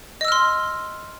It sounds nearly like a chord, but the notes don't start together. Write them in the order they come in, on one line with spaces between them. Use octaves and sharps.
D#5 E6 F6 C6